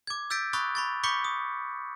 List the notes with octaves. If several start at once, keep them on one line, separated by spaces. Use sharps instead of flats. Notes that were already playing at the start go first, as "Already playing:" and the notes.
D6 G#6
E6 G6 A6 B6 D7
B5 C#6 D#6 F#6 A6
B5 C#6 A6
B5 C#6 D6 G6 B6 C#7
D#6